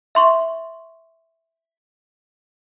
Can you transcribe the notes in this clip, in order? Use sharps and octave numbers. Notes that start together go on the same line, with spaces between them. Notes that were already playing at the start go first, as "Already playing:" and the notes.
E5 C6 C#6